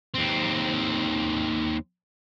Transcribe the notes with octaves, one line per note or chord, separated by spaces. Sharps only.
D#2 C4